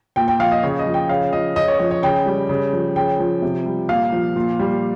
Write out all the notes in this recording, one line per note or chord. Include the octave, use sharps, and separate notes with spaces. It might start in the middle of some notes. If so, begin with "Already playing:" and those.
A#2 G5
G5
F3 F5
D#5
C#3 C#5
D#5
F3
G5
C#3 F5
F3 D#5
C#3 D#5
C#5
F3 C#5
C#5
C#3 G5
G3
C#3
F3
C#3 G5
F3
C3
G3
A#2 F5
F3
A#2
G3